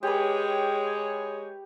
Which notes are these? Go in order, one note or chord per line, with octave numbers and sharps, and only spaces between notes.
G#3 G4 B4 C#5